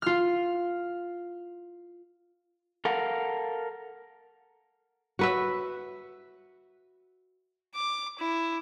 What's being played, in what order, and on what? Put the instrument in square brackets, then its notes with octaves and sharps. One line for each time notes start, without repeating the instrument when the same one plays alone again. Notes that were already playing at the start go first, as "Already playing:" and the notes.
[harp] F4 F6
[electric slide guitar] A4 A#4 F5 F#5
[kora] F#4 B4 E5
[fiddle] D6
E4